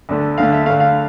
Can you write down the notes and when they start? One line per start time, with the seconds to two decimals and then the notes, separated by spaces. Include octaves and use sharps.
0.09 D2 D3 A3
0.38 D2 D3 A3 F5
0.52 E5
0.66 D2 D3 A3 F5
0.80 F5